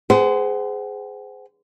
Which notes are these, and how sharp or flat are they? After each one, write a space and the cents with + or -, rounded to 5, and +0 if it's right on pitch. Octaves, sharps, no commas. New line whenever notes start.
G#4 +5 C5 -25 F#5 +35